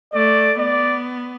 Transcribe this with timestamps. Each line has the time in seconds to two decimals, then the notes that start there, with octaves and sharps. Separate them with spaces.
0.14 A3 D5
0.59 B3 D5